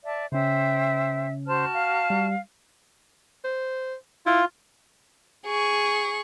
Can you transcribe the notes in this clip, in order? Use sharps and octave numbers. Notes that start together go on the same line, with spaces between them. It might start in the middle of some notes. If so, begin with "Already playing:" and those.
D5 E5 A5
C#3 C#4 C5 E5 G5
F#4 C5 A5 F6
F5
G3
C5
E4 F4
G#4 C#6